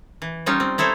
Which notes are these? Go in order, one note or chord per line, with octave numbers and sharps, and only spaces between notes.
E3
G3 C#4 D#4 F4
C4
D#4 E4 A4 C5 C#5